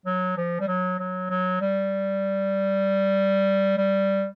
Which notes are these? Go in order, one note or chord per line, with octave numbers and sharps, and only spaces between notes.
F#3
F3
G3
F#3
F#3
F#3
G3
G3